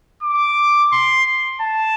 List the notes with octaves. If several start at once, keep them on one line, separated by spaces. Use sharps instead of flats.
D6
C6
A5